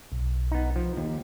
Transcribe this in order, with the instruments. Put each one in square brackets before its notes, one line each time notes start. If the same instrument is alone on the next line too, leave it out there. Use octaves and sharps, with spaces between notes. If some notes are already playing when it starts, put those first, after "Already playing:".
[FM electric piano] B1
[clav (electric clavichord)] B3 D#4
F3
D#2